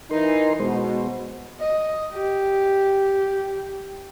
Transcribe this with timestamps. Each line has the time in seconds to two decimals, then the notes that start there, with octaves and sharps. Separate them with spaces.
0.11 E3 D#4 A#4 C6
0.60 B2 G#3 C5
1.61 D#5
2.13 G4